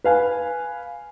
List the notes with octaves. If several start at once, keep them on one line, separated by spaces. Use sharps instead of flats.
B4 F5 G#5